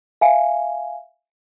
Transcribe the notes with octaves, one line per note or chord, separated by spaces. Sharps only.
E5 F5 G#5